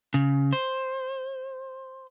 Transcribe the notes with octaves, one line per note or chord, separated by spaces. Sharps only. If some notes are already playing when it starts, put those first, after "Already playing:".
C#3
C5